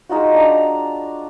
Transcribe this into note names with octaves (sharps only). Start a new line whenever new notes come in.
G#3 D#4 F4 F#4
D4 A#5